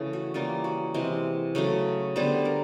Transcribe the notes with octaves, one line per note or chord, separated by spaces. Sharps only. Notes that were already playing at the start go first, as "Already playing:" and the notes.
Already playing: C#3 E3 A3
F#4
C#3 E3 G3 A#3 F4
F#4
C3 E3 G#3
C#3 F#3 A3
D3 G3 B3 C5
A#4